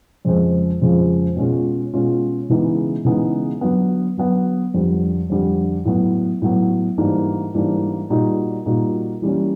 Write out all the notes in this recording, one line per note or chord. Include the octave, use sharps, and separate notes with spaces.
F2 C#3 F3 G#3 C4
F2 C#3 F3 G#3 C4
B2 G#3 C#4 F4
B2 G#3 C#4 F4
C#3 E3 G#3 B3 D#4
C#3 E3 G#3 B3 D#4
D3 F#3 B3
D3 F#3 B3
F2 D3 G3
F2 D3 G3
A2 F#3 B3
A2 F#3 B3
G#2 E3 G3 A#3 D4
G#2 E3 G3 A#3 D4
A#2 G3 A#3 D#4 F#4
A#2 G3 A#3 D#4 F#4
E3 G3 A#3 C#4